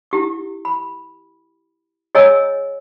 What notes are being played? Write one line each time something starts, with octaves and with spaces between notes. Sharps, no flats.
E4 G4 D6
B5
G#4 C#5 D#5 G#5 A#5 E6